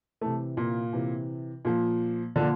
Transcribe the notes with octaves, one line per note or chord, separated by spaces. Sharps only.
C3 E3 A3
A#2 A#3
C3 E3
A#2 F3
A#2 D3 F3 D4